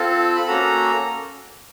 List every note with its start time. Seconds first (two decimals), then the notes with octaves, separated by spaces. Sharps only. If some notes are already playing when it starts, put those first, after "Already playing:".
Already playing: C4 F4 A4 A5
0.35 B5
0.47 A#3 C#4 F#4 A4 A#5